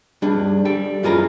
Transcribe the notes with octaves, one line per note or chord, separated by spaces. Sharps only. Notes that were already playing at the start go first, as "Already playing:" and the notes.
G3 D4 G#4
G3 A4 G5
F#2 E4 F4 G#4 B4 A#5